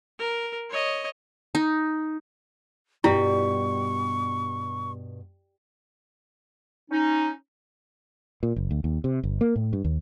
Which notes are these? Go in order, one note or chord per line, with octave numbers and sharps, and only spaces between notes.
A#4
C#5 D#5
D#4
G2 B2 G3 E4 F4 C#6
C#4 D#4
A#2
F#1
D2
D#2
C3
G1
A#3
A2
G2
D#2